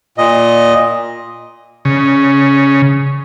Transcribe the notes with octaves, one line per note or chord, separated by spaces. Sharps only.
A#2 D#5
C#3